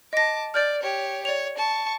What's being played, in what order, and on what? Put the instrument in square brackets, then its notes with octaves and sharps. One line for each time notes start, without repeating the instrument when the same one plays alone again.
[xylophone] D#5 A#6 [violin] A5 D6
[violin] D5 [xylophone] F6 G6 A6
[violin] G4 C#5
[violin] C#5 [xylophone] D5 F7
[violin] A5 C#6